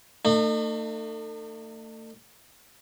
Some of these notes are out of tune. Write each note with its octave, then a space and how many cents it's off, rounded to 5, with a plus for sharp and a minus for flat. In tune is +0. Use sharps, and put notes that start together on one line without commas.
A3 +35 D#4 -40